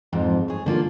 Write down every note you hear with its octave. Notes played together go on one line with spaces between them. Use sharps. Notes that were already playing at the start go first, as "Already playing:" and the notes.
F2 G#2 F3
G#4 C#5
D3 A#3 F4